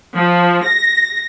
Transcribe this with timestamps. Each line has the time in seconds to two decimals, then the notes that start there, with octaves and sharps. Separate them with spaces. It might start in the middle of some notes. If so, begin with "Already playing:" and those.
0.14 F3
0.65 A#6